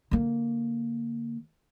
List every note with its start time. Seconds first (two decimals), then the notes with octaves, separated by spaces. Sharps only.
0.11 D3 A#3